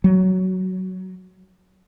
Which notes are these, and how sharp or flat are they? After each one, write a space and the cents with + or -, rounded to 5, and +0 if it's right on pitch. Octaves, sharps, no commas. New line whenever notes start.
F#3 +10